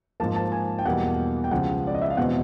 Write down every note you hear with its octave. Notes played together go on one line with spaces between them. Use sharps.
G#2 F3 A#3 A5
A5
G#5
G5
E2 B2 G3 A#3 F#5
G5
C#2 C#3 F3 F#5
D5
D#5
E5
F5
E2 B2 G#3 C4 F#5